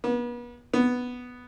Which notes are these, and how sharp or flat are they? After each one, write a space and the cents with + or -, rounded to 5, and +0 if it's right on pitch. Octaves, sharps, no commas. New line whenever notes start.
B3 -40
B3 +0